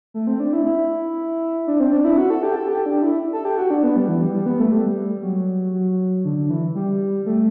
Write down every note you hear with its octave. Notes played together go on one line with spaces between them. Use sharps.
A3
C4
D4
E4
E4
D4
C4
D4
E4
F#4
A4
G4
A4
G4
D4
E4
A4
G4
F#4
D4
B3
G3
E3
G3
G3
B3
A3
G3
F#3
F#3
D3
D3
E3
G3
A3